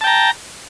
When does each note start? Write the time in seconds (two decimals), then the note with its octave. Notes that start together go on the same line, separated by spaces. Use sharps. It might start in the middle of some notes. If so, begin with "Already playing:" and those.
0.01 A5
0.04 G5
0.07 A#5